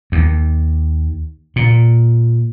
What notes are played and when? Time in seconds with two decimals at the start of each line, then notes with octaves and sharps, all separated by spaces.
0.12 D#2
1.56 A#2